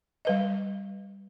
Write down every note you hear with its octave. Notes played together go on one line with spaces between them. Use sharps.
G3 B4 D#5